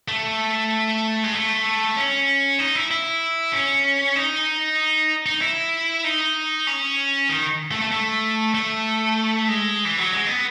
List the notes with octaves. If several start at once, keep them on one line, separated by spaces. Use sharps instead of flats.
A3
G#3
A3
C#4
D#4
E4
E4
C#4
D#4
D#4
E4
D#4
C#4
D#3
A3
A3
A3
A3
G#3
E3
F#3
G#3
B3